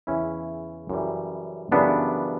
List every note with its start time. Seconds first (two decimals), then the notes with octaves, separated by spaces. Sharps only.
0.07 E2 C#3 E3 C#4 E4
0.89 F#2 C#3 E3 G3
1.72 F#2 C#3 E3 G3 B3 D4